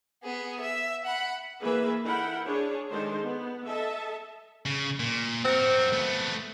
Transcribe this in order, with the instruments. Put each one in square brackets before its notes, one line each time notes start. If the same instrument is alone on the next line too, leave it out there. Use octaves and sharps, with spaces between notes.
[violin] B3 G#4
E5
F#5 B5
[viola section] E3 A#3 G#4 B4 E5 B5
E4 A4 A#4 F#5 G5 B5
D4 G#4 C#5
D#3 G#3 D4 D#4 A4 C5
B3
A4 D#5 E5 A5
[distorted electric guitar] C#3
A#2
[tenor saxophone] C4 [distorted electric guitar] F#4 A#4
[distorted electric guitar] A3 B3